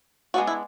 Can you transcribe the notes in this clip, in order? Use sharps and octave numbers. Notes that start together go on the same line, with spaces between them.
G#3 B3 D4 F#4
E4